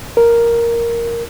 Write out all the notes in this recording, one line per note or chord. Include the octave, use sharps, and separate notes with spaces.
A#4